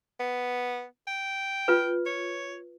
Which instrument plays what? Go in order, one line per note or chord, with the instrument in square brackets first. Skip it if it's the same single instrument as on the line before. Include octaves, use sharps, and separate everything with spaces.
[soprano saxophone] B3
G5
[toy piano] F4 B4
[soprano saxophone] C#5